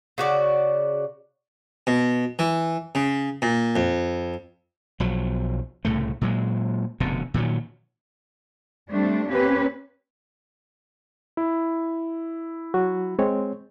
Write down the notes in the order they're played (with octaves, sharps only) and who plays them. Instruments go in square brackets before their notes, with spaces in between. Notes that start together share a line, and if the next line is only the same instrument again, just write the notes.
[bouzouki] C#3 F#4 D5
[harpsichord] B2
E3
C#3
A#2
F2
[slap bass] B1 F3 F#3
C2 A2 C#3 A3
A#2 F#3 G#3
F1 B2 D3
A#2 D#3 E3 F#3
[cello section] G3 A3 C4 D4
A#3 C4 C#4 G4 B4
[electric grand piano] E4
[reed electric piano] F#3 F#4
G#3 C4 C#5